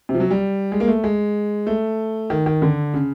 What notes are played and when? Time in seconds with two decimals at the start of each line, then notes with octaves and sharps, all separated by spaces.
0.09 C3
0.14 F3
0.20 F#3
0.31 G3
0.72 G#3
0.80 A#3
0.88 A3
1.04 G#3
1.67 A3
2.30 D#3
2.46 D#3
2.62 D3
2.94 C#3